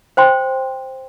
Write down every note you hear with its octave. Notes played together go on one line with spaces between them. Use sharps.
C5 G5 C6